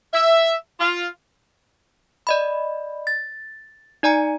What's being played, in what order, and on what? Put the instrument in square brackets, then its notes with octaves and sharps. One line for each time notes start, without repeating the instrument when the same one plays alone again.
[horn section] E5
F4
[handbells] D5 D#5 B5
A6
D#4 D5 G#5 A#5